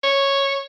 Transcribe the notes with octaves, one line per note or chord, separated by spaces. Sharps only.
C#5